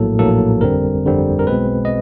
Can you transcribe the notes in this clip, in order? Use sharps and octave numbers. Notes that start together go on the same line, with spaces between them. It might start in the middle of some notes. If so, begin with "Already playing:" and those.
Already playing: A#1 A2 F#3 A#3 A4
A#1 A2 F#3 A#3 A4
G1 F2 D3 G3 C4 A#4
G1 F2 D3 G3 C4
A#4
B1 B2 G#3 C4 B4
D#5